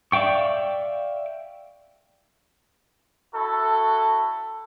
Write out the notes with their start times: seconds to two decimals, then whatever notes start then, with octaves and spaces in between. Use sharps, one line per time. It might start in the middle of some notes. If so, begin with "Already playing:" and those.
0.12 D5 E5 F5 G5 C#6
3.35 E4 F#4 A4